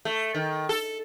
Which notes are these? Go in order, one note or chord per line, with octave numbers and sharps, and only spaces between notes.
A3
D#3
A4